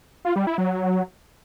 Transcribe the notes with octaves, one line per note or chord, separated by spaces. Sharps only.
F4
G3
E4
F#3